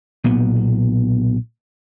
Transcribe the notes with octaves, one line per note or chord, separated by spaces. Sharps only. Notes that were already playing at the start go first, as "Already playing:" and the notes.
B1 A#2 B3